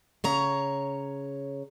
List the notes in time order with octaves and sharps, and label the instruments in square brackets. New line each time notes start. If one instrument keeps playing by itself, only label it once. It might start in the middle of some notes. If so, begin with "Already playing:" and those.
[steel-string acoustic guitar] C#3 C#5 A#5